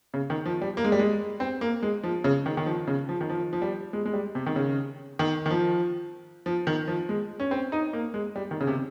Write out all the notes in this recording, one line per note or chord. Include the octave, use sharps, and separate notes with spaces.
C#3
D#3
F3
G3
A#3
G#3
G3
G#3
C4
A#3
G#3
F3
C#3
D#3
D#3
F3
C#3
F3
D#3
F3
F3
G3
G#3
G#3
G3
C3
D#3
C#3
D#3
D#3
F3
F3
D#3
F3
G#3
C#4
C4
D#4
A#3
G#3
G3
D#3
C#3
C3